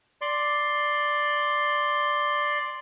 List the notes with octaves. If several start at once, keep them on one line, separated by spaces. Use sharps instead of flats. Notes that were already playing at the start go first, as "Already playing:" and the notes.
D5 C6